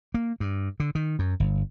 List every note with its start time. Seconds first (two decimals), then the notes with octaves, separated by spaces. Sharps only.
0.14 A#3
0.40 G2
0.80 D3
0.95 D#3
1.19 F#2
1.40 G1